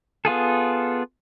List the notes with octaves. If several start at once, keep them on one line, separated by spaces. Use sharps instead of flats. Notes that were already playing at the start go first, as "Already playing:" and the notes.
B3 F4 G#4 A4